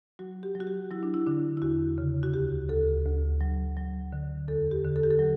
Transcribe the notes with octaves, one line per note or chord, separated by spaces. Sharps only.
F#3 F#4
G4
F#3
F#4
G4
F#3 E4
D4
E4
D3 D4
E4
E2 F#4
C#3
F#4
D2 G4
D2 A4
D2
F#3
F#3
D3
E2 A4
G4
D3
A4
G4
A4
F#3